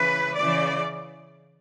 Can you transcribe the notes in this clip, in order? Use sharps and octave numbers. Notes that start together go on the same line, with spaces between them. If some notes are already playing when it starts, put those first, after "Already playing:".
Already playing: C#3 E3 B4
C#3 E3 D5